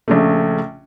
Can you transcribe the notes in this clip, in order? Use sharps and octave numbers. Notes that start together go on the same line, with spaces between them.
A#1 C#3 A3